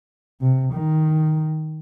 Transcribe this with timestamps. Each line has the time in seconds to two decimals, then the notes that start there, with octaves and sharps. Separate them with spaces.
0.41 C3
0.73 D#3